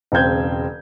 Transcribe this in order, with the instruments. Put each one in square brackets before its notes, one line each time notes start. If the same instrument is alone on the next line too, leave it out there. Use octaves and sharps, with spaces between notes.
[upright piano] E1 C#3 C4 G6 G#6